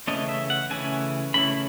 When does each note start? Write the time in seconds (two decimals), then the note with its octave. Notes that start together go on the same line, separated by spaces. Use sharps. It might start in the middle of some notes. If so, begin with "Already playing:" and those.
0.07 C#3 E3 A3 C#4 E4 D#5
0.29 E5
0.50 F#5
0.70 C#3 E3 A3 C#4 E4 G#5
1.34 C#3 E3 A3 C#4 E4 B5